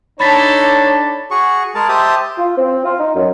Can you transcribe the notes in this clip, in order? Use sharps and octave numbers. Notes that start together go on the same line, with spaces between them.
D4 D#4 A4 C#5 A5 B5 A6 B6
F#4 G#4 C#6
G#3 G#4 A#4 A5
G4 C5 E5 A5 D#6
F4
C4
F4
D#4
F#2